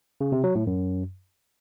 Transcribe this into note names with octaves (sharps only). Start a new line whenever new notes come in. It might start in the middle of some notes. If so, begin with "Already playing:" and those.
C#3
C3
F#3
A2
F#2